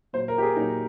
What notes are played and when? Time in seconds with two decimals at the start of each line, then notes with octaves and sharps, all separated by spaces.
0.13 A#2 F#3 C5
0.28 A#4
0.38 G4
0.42 G#4
0.56 A#2 F#3 D#4